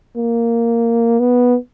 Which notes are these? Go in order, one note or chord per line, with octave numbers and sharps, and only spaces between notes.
A#3
B3